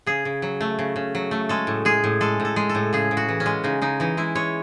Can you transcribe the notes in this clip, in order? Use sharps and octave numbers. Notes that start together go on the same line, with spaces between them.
C#3 G#4
C#3
F#3
A3
C#3
C#3
F#3
A3
G#3 A4
A2
G#3 G#4
A2
G#3 A4
A2
A4
G#3
A4
A2
C#3 G#4
C#3
F#4
E3
C#4
G#3
C#3 D#4
C#3 D#4
E3 D#4
G#3 E4
G#3 C#5